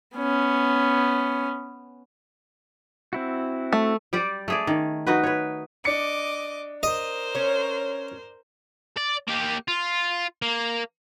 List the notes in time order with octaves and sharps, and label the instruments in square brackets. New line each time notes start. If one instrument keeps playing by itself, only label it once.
[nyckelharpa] B3 C#4
[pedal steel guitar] C4 E4 F#4
[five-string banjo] A3
[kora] G3 G4 D5
A3 G#4 D5
D#3
D#4 F#4 B4
B4 C#5
[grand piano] D4 C#7 [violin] D#5 D6
[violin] A#4 C5 [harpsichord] D#5
[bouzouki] C#4 C#5
[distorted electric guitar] D5
A#3 G4
F4
A#3